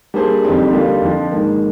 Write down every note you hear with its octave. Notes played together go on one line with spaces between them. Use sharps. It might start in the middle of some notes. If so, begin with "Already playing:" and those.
G3 A#3 D4 G#4 C5
F2 D3 G3 C4 D#4
D3 G3 A#3 F4
F2 D3 F3
G#2 D#3 A#3